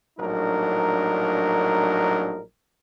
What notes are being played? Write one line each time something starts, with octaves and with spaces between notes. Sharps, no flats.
A#1 A2 F#3 D4 D#4 A#4